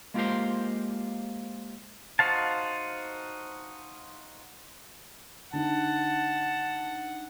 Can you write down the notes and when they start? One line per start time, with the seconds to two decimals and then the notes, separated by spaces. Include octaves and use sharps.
0.14 G#3 A#3 F4 G4 A#4 C5
2.19 D#4 F#4 C5 F5 A5
5.53 D3 D#4 F#5 A5